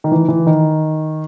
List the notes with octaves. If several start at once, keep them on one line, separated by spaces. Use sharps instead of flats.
D#3
E3
E3
D#3